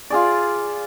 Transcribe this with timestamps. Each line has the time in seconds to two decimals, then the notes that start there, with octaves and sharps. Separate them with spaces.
0.10 F4 G#4 D5